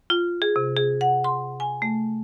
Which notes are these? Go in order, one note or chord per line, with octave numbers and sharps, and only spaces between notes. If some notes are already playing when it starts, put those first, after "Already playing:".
F4
G#4
C3
G#4
F#5
C6
G#5
A3